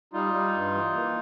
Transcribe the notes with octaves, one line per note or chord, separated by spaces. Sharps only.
G3 D#4 F4
G3
G2
E3
A#3